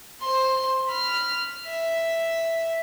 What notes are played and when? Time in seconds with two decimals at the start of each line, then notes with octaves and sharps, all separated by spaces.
0.21 C5 C6
0.88 B5 F6
1.65 E5